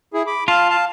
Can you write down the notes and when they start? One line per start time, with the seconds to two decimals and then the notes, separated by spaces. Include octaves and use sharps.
0.14 E4 G#4
0.27 B5 D6
0.48 F4 F5 A5
0.70 F5 A5